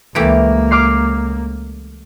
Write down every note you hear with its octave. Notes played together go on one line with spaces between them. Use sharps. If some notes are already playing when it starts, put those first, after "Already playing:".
C#2 E3 A3 A#3 G4 D7
D6 F6 C7